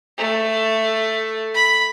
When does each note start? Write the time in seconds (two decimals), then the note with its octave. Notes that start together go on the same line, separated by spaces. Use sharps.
0.18 A3
1.55 B5